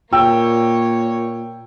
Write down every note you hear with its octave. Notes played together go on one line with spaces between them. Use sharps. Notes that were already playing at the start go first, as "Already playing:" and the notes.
A#2 A#3 C#5 G5 E6